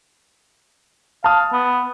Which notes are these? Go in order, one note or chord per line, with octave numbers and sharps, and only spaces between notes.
F5 A5 D#6
B3